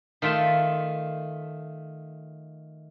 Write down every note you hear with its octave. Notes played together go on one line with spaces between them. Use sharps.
D#3 A3 F4 E5 A5